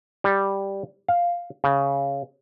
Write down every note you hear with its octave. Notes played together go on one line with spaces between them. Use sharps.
G3
F5
C#3